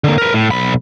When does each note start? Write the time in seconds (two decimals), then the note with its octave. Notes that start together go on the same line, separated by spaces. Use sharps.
0.04 D3 A#3
0.18 A#4 B4
0.34 A2
0.51 B1 B5